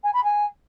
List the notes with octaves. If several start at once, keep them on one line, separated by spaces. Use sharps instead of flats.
G#5
B5
G#5